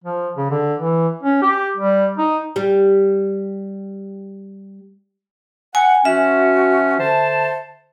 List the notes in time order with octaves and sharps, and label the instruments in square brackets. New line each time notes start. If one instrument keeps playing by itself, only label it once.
[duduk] F3
C#3
D3
E3
C#4
G4
G3
D#4
[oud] G3 G4
[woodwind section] F#5 [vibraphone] G#5
[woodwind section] F3 C#4 F#4 [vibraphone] E5
[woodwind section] D3 C5 A5